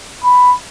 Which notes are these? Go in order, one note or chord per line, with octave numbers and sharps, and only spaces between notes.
B5